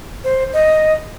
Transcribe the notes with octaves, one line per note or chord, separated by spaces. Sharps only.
C5
D#5